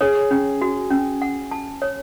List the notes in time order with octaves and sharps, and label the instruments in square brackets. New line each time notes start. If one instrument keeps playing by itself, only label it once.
[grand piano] G#4 [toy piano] C#5
[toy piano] C#4
F#4
C#4
F#5
A5
C#5